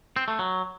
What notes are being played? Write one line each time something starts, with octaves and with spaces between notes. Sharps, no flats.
C4
A3
F#3